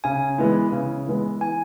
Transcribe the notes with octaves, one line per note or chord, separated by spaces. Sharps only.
C#3 G#5
E3 G#3 B3 E4
C#3
E3 G#3 B3 E4
E3 G#5